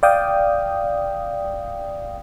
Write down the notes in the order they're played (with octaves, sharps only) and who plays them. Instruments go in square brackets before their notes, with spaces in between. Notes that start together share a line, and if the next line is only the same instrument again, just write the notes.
[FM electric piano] D5 F5 G5 D#6